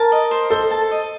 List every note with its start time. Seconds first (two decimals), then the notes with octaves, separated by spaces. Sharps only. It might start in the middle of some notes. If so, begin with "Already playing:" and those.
Already playing: A#4 A5
0.12 D#5
0.31 C5
0.50 A4 C5
0.71 A5
0.91 D#5